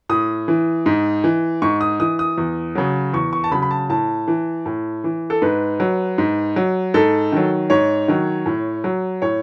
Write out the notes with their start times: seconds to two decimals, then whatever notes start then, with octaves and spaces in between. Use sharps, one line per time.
0.09 A2 D#6
0.48 E3
0.86 G#2
1.24 E3
1.62 G#2 C#6
1.81 D#6
2.00 E3 D#6
2.19 D#6
2.38 E2
2.75 C#3 F#3
3.13 E2 C#6
3.33 C#6
3.44 A5
3.51 C#3 F#3 B5
3.62 B5
3.71 A5
3.90 A2 A5
4.28 E3
4.66 A2
5.04 E3
5.30 A4
5.42 G#2 B4
5.80 F#3
6.18 G#2
6.56 F#3
6.94 G#2 A4
7.32 D#3 F#3
7.70 G#2 C#5
8.08 D#3 F#3
8.46 A2
8.84 F#3
9.22 A2 C#5